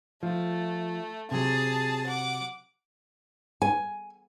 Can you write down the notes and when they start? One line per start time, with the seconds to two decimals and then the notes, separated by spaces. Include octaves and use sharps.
0.23 F3 A3
1.31 C3 F#3 G#4 A5
2.07 F#5 D6
3.62 G#5